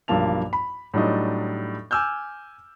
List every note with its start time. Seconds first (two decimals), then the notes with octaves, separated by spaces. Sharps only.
0.08 B1 G2 F3 A#3 A5 F7
0.53 B5
0.94 A2 F#3 G3 D4 D#4 D#5
1.91 G#5 D6 E6 F6 G6